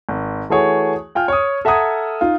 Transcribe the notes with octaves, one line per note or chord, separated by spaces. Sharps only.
G#1
E3 A3 F#4 G#4 C#5
F4 G5 G#5 F6
C#5 D#6
A4 E5 F#5 A#5 D#6 G#6
D#4 F4